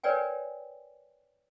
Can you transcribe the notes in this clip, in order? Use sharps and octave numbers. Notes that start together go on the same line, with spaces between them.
A#4 B4 C#5 D5 G5 G#5